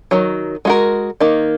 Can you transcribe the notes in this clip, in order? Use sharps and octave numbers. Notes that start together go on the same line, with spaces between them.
D#3 F#3
G#3 F#4 A#4
D#3 A#3 D#4